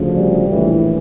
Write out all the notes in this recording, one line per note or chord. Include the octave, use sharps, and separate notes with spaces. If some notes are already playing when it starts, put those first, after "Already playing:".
Already playing: D2 C#3 F3
G3
A#1 A2 E3